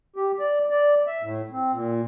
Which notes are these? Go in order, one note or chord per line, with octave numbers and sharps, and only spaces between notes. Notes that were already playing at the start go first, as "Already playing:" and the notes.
G4
D5
D5
E5
A2
C4
A#2